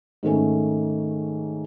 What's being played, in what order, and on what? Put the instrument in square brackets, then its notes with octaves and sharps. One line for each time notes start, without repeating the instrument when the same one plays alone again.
[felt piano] G#2 D#3 A3 C#4